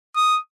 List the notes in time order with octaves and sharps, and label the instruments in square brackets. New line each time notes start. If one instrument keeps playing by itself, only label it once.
[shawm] D#6